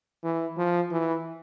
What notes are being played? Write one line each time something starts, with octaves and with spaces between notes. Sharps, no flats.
E3
F3
E3